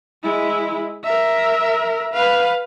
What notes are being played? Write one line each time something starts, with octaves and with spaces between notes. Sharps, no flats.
G#3 E4
A#4 E5
B4 F5